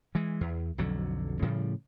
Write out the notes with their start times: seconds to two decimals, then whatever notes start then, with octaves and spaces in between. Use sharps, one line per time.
0.15 E3 G#3
0.41 E2
0.78 B1 F2 D3 F#3
1.42 A2 C#3 F3 G3